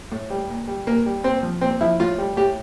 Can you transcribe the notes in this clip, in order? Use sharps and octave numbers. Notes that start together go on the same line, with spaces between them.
A2
G3
A#2
G3
A#2 A#3
G3
A#2 C4
F3
A#2 C4
F3 E4
A2 F4
G3
A2 G4